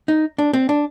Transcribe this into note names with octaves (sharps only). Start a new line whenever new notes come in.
D#4
D4
C4
D4